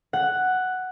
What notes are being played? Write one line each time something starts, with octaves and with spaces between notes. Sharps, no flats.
F#5